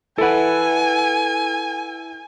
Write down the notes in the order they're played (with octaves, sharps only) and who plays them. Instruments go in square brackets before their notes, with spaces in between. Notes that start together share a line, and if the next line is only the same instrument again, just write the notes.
[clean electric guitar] E4 B4 [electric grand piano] A4 F#5 [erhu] G#5